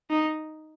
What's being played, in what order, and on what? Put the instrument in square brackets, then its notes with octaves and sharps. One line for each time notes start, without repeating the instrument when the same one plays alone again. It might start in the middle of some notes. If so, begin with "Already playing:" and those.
[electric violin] D#4